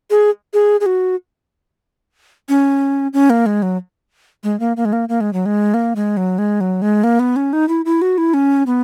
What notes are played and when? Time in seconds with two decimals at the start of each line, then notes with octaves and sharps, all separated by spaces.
0.10 G#4
0.54 G#4
0.80 G#4
0.86 F#4
2.49 C#4
3.13 C#4
3.30 A#3
3.46 G#3
3.62 F#3
4.44 G#3
4.60 A#3
4.77 A#3
4.85 G#3
4.93 A#3
5.09 A#3
5.21 G#3
5.33 F#3
5.46 G#3
5.74 A#3
5.96 G#3
6.17 F#3
6.38 G#3
6.61 F#3
6.82 G#3
7.04 A#3
7.19 B3
7.36 C#4
7.53 D#4
7.69 E4
7.85 E4
8.02 F#4
8.18 E4
8.34 C#4
8.67 B3